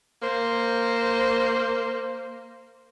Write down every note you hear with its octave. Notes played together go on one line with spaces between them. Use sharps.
A#3 C5